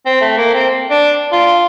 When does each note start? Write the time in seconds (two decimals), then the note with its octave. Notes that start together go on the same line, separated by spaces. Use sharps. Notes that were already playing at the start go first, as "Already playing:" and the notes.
0.06 C4
0.21 A3
0.37 A#3
0.54 C4
0.90 D4
1.33 F4